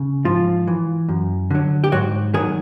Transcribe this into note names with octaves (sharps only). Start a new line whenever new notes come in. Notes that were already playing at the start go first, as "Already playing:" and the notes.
Already playing: C#3
G#2 F3 F4
E3
F#2
D3 F#3
G4
G#2 F#3 F#4
D#3 F#3 G#3 G#4